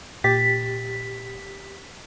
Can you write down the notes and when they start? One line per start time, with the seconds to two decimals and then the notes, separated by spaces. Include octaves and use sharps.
0.24 A#2 G4 A6 B6